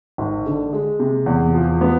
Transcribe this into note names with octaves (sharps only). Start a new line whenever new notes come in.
G#1
D3
G#3
C3
E2
F3
B3